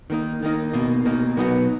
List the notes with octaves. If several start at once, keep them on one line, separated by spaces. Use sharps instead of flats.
D#3 A#3 D#4
D#3 A#3 D#4
B2 A#3 D#4
B2 A#3 D#4
B2 F#3 B3 D#4 F#4